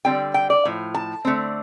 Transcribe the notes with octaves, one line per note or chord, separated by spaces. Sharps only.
D3 G3 C4 G5
G5
D5
A2 F3
A5
D3 A3 C4